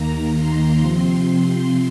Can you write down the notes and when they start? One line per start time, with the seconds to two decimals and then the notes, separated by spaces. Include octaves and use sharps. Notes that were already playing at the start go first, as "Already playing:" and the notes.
Already playing: D#2 D#3 A#3 A#5
0.35 C6
0.78 C3 F3 C4 C6